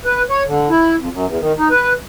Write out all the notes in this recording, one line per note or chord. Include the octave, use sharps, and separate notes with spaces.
B4
C#5
D3
E4
F2
F#2
E2
D#3
D#4
B4